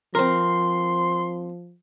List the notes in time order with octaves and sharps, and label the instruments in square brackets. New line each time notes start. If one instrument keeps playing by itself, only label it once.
[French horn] F3 [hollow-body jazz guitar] C4 A#4 [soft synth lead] C6